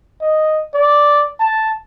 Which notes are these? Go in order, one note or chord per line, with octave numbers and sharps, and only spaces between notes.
D#5
D5
A5